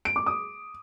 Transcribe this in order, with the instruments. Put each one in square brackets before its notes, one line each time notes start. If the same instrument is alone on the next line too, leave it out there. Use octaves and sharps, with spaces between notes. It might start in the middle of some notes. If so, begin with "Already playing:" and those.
[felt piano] D7
D6
D#6